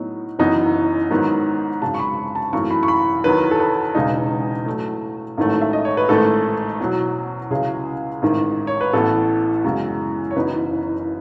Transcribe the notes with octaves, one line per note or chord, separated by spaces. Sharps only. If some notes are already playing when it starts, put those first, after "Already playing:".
Already playing: A2 F#3 B3 D#4
F#1 F#2 E3 B3 D#4
G#2 D#3 F#3 B3
G#1 F#2 C#3 G#3 A5
C#6
B5
B5
A5
G#1 F#2 E3 A3 C#6
B5
C#6
B5
E2 D#3 F#3 B4
A4
B4
E1 E2 C#3 G#3 D#4
A2 F#3 A3
A1 G#2 D#3 F#3 A3
E5
D#5
C#5
B4
A1 G#2 D#3 A3 A4
E2 B2 F#3
C#2 C#3 F#3 C#4 E4 G#4
A1 G#2 D#3
C#5
B4
A1 A2 E3 B3 A4
F#2 C#3 E3 G#3 B3
C#5
F#1 F#2 E3 B3 D#4 B4